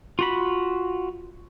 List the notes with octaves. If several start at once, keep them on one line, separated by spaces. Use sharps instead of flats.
F4 F#4 B5